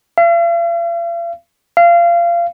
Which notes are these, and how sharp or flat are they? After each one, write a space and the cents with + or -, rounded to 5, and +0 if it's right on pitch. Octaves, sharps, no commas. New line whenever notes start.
F5 -45
F5 -25